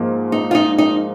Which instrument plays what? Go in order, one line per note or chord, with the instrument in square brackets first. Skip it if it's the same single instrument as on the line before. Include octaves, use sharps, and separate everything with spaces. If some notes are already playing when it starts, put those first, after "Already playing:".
Already playing: [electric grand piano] G#2 F3 A#3
[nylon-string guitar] D#4
F4
D#4
D#4